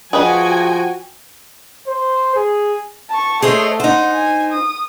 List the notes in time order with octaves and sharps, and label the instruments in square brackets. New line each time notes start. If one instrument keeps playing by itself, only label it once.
[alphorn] F3 [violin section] F#4 G5 G#5 [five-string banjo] G#4 B4 D#5
[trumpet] C5
G#4
[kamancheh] A5 C#6
[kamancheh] A3 D#5 [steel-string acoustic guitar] G#4 C5 C#5
[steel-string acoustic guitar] D#4 C5 [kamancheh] F#5
[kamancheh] G#5
D#6